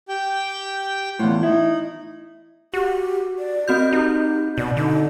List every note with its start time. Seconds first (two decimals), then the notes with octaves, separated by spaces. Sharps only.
0.09 G4 G5 G6
1.19 E2 A2 F4 F#5
1.43 D#4 E4
2.74 F#4 G4
3.39 D5
3.68 C4 F#4 D#5 G6
3.92 D#4 G4
4.58 B2 D5
4.77 D3 D#4